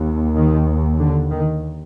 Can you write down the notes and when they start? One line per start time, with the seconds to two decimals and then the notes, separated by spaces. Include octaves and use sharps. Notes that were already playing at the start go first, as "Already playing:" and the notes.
Already playing: D#2
0.36 D#3
0.99 D3
1.31 D#3